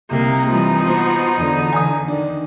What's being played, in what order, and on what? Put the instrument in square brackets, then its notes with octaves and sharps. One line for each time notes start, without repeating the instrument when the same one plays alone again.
[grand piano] C2 C3 [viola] A#3 [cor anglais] D#4
[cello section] E3 G3 [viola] F3
[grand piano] B3 [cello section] F#4 C5
[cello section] E2 D3
[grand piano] G#5 D#6
D#3 D4